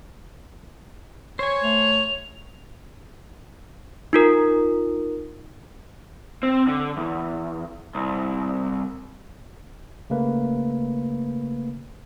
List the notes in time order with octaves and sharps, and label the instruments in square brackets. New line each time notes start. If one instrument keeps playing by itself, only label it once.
[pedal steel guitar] C5 G#5 [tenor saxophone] C#5 [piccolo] C#6
[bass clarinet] A3 [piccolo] F7
[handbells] D#4 F4 A#4
[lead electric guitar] C4
D3
E2
C2
[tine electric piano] C#3 A3 A#3 B4